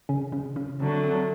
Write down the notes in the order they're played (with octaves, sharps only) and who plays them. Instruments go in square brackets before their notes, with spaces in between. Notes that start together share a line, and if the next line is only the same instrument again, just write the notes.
[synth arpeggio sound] C#3 C#4
C#3 C#4
C#3 C#4
[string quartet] D3 F#3 A3 [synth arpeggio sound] C4
[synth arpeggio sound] C4